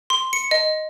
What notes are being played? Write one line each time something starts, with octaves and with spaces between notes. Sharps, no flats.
C6
C#7
D#5